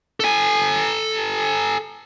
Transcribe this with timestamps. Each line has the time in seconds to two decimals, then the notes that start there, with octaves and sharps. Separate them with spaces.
0.20 A4 G#5